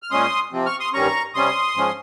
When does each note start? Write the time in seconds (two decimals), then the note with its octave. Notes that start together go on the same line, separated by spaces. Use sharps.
0.03 F6
0.11 A#2 G#3 C#4 C6 D#6
0.52 C3 F3 C4
0.66 C#6 F6
0.80 C6 D#6
0.93 G2 D#3 G3 C#4 A#5 C#6
1.34 C3 G3 C#4 C6 D#6
1.75 G#2 F3 G#3 C#4